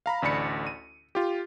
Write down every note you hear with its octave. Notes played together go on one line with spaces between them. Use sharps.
F5 A#5 B5
A1 D2 D5 B5 C#7
D#7
F4 G4